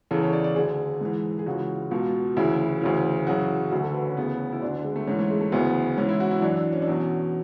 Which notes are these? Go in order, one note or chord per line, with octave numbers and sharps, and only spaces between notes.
E2 C#3 E3 A4
C#5
D5
D5
D2 D3 G#4
G#2 E3
G#4
C#2 C#3 E3 F#4
C#2 B2
D2 C#3 E3 E4
D2 C#3 E3
F#2 C#3 E3 F#4
D2 D3 F#4
A4
B4
C#4
D2 C#3 E3 B3
E4
D2 D3 D4
D4
G#3
A3
G#2 E3 C#4
A3
G#3
A3
D2 C#3 E3 B3
G#2 E3 C#4
E4
F#4
E4
F#2 E3 D4
D4
C#4
D4
E2 B2 C#4